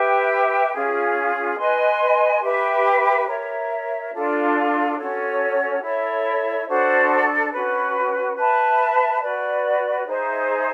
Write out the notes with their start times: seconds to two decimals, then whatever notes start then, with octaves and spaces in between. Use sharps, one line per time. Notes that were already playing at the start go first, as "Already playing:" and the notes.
Already playing: G4 B4 E5 G5
0.72 C#4 F4 G#4
1.57 B4 D#5 G#5 C6
2.42 G4 B4 E5
3.27 A#4 C#5 E5
4.12 D4 F4 A4
4.97 C#4 F#4 A4 C#5
5.81 E4 A4 C#5 E5
6.66 D4 F#4 A4 C5
7.51 C#4 F#4 B4
8.36 B4 E5 A5
9.21 F#4 B4 D5
10.05 D#4 G#4 C5 E5